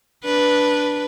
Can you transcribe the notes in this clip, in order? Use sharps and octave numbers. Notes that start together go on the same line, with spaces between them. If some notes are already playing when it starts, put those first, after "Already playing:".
D4 B4